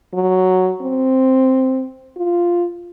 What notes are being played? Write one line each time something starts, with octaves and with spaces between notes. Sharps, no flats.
F#3
C4
F4